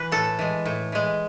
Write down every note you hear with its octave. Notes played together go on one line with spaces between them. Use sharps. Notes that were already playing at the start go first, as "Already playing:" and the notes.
Already playing: E3 B4
A2 A4
E3 G#3
A2
E3 G#3